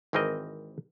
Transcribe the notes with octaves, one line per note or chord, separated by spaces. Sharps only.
G#1 E3 C4 A#4 D#5